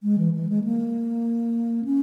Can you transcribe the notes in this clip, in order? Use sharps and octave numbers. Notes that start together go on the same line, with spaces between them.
G#3
E3
E3
G#3
A#3
C#4